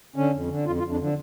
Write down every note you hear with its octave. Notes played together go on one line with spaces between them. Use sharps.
D3 C#4
F2
D3
F2 F4
F4
F2
D4
D3 F3